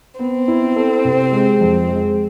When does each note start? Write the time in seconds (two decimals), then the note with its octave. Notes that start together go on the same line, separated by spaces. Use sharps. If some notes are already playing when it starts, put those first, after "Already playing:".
0.19 B3 C4
0.48 E4
0.76 A4
1.05 C3
1.32 G#3
1.61 F2
1.88 G#3